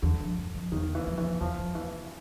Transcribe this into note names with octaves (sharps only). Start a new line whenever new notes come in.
E2 D3
F2
F#2
F2
E2 D#3
E3
F2
E3
E2 F3
F2
E2 E3